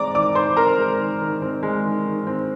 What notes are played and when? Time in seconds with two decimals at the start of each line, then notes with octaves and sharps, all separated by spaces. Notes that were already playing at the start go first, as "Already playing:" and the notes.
Already playing: G#3 C4 D5 A#5 D6
0.15 D#3 D5 D6
0.35 D#3 C5 C6
0.57 C4 A#4 A#5
0.79 G#3
1.00 D#3
1.21 D#3
1.42 C4
1.63 G#3
1.85 D#3
2.06 D#3
2.27 C4